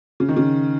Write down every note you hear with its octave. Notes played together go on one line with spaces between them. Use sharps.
C#3
D#3
C#3